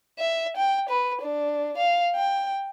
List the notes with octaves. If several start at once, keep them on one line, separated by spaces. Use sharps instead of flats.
E5
G5
B4
D4
F5
G5